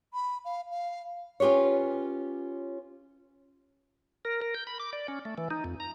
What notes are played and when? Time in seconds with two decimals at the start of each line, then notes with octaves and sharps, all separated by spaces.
0.14 B5
0.45 F5
0.71 F5
1.40 C#4 F4 G4 B4 C#5
4.25 A#4
4.42 A#4
4.55 G6
4.67 B5
4.80 D6
4.93 D5
5.08 C#4
5.25 A3
5.38 E3
5.51 D#4
5.64 F2
5.80 A#5